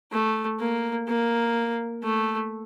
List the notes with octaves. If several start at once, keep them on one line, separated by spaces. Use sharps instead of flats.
A3
A#3
A#3
A3